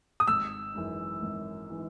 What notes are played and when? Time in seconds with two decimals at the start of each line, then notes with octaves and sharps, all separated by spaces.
0.20 D#6
0.27 G#1 E6
0.75 F#2 E3 G#3 D#4
1.22 G#1
1.70 E3 G#3 D#4